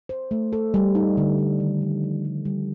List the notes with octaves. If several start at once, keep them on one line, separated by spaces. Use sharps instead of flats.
C5
A3
A4
G3
D#4
D3
D#4
D#3
F3
F3
G3
G3